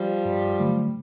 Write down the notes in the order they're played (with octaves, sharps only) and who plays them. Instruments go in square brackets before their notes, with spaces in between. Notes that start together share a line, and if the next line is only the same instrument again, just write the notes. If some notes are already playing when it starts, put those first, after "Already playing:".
Already playing: [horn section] F3 G3
[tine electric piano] G2
D3 F#3 A3